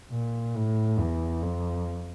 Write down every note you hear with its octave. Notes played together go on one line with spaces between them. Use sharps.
A#2
A2
E2
F2